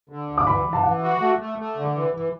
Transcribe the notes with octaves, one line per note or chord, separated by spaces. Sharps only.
D3
D2
D6
E3 B5
E3
A5
E3 F#5
F#4
A3
A3
A3
D3
E3
E3